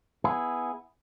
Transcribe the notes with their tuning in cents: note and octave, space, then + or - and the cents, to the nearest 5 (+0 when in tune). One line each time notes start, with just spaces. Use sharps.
B3 +0 E4 +0 G#4 +0